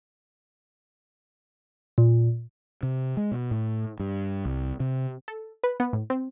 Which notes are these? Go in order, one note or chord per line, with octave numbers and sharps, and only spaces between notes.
A#2
C3
G#3
B2
A2
G2
C2
C3
A4
B4
B3
A2
C4